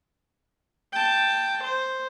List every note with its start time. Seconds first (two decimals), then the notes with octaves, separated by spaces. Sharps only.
0.93 G5 A5
1.64 C5